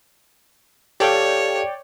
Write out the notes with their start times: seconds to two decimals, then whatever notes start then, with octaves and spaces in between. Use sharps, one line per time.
1.00 G4 A4 C#5 D5 F5 G5